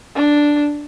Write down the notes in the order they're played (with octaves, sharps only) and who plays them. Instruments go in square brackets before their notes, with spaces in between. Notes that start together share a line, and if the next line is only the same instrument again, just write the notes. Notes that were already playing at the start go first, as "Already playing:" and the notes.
[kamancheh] D4